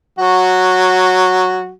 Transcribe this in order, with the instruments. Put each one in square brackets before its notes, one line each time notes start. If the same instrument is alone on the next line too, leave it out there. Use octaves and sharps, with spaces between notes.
[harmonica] F#3 F#4